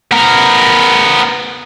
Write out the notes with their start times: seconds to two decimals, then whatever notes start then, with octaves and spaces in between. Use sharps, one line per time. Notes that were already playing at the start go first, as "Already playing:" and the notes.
0.11 B3 A#4